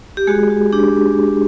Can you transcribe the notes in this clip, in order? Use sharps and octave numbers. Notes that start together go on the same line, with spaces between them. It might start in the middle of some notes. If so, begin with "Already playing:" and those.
G4
G#3 F#4 G#4
F#4
D4 G4